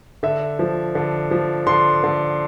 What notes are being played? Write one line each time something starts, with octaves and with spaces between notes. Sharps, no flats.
D3 E5
F3
D3
F3
D3 C6
D3